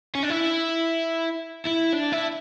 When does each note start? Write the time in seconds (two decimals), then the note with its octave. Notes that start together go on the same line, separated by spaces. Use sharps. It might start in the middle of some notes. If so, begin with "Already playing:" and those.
0.15 C#4
0.23 D4
0.30 E4
1.67 E4
1.94 D4
2.13 E4